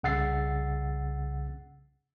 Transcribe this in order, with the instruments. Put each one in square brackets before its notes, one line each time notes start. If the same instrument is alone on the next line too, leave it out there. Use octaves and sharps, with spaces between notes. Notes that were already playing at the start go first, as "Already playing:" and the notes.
[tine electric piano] C2 C#3 F#5 E6 A6 C7